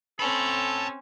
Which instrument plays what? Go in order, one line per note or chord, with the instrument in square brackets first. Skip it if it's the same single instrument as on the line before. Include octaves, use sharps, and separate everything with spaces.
[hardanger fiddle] C4 C#4 [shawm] A4 [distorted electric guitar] A5 B5